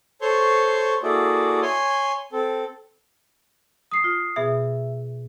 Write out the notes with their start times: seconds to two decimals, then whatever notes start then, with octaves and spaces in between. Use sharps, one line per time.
0.21 A4 C5 C#5 C6 C#6
1.03 A#3 E4 F#4 G#4 A4 D5
1.62 C#5 G#5 C6
2.33 C4 A4
3.91 D#6 C7
4.04 F4
4.36 B2 B3 G#4 E5